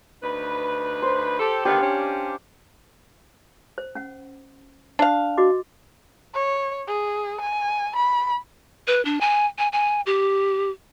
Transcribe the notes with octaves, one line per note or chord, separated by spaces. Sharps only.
D2 D#4 B4
C5
G4 A4
D3 D#3 B3 G4 F5
C#4 D4
C5
C#4 F#5
D4 F5
F#4 D#5 D6
C#5
G#4
G#5
B5
B4
D4
G#5
G#5
G#5
G4